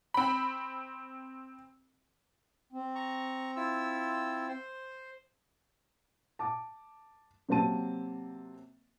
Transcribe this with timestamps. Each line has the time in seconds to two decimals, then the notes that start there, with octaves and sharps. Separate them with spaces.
0.14 C4 B5
2.73 C4
2.95 A#5 C#6
3.56 E4 F4 E6
4.48 C5
6.39 A5 D6
7.49 C3 F#3 A#3 C4 A5 D#7